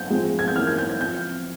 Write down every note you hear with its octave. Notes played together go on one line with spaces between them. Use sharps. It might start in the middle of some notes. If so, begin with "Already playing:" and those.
Already playing: G6
F3 G#3 C4
G#6
G6
E3 A#3 C#4 F6
G#6
G6
G#6
F3 C4 G6